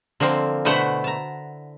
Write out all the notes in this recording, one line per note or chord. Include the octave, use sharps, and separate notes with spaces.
D3 F3 A#3 C4
B2 D3 A3 E4 C5 F#5
A5 A#5